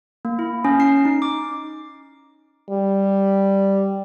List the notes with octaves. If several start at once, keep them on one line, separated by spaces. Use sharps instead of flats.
A#3
E4
C#4
C7
D#4
D6
G3